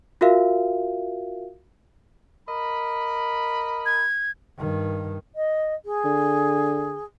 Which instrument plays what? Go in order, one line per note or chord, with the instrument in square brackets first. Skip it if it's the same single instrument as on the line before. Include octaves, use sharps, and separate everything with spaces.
[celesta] F4 F#4 A#4 E5 F5
[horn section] A#4 D#5 B5
[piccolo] G#6
[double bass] G2 D#3
[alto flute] D#5
G#4
[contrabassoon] D3